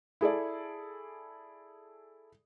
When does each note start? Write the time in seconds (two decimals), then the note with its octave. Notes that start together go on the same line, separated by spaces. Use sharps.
0.21 E4 G#4 A4 D5